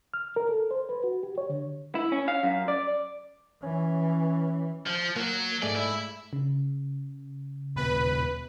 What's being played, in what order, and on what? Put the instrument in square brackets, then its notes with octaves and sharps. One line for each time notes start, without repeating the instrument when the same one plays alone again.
[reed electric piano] F6
A#4
A4
C5
B4
F#4
G4
C#5
D3
[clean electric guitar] E4
C#4
F5
F#2
D5
[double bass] E3 [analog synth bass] C#4
[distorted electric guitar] F3
[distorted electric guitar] F#3 [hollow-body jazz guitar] A#3
[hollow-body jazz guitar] G#2 A3 G#4 [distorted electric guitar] D5
[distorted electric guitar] E4
[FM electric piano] C#3
[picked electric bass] D#1 B2 [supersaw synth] B4